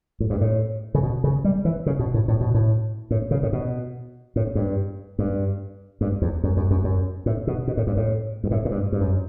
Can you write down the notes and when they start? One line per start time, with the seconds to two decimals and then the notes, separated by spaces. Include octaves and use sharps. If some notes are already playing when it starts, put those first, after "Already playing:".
0.20 A2
0.30 G2
0.41 A2
0.95 C#3
1.03 B2
1.24 C#3
1.44 G3
1.65 E3
1.86 C#3
1.99 B2
2.14 A2
2.28 A2
2.41 B2
2.54 A2
3.11 A2
3.31 C#3
3.43 A2
3.53 B2
4.36 A2
4.55 G2
5.19 G2
6.01 G2
6.22 E2
6.43 F#2
6.57 F#2
6.71 F#2
6.84 F#2
7.26 A2
7.47 B2
7.68 B2
7.77 A2
7.87 G2
7.97 A2
8.44 G2
8.51 A2
8.65 A2
8.71 G2
8.92 G2
9.01 F#2